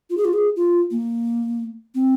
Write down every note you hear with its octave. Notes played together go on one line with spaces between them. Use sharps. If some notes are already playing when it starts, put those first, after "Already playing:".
F4
G#4
F4
G#4
F4
A#3
C4